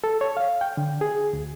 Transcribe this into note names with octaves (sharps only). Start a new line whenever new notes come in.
A4
C#5
F5
G5
D3
G#4
D2